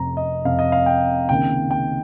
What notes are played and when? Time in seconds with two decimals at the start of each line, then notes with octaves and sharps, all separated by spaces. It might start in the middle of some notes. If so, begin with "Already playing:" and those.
Already playing: F1 F2 C3 A#5
0.17 D#5
0.45 F1 F2 C3 F5
0.59 D#5
0.72 F5
0.86 G5
1.29 C#2 C3 D#3 A#3 G5
1.71 G5